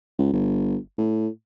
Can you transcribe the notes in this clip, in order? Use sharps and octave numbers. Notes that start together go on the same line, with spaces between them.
C#2
G1
A2